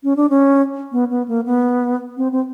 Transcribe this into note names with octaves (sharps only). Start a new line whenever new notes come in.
C#4
D4
C#4
B3
B3
A#3
B3
C4
C4